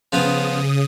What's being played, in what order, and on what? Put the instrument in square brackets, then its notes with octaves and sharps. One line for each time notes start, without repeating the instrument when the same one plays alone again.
[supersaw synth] C#3 D#6 [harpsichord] F3 B3 F4